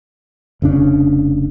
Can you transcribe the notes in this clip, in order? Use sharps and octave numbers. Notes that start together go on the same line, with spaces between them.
F1 C#3 D4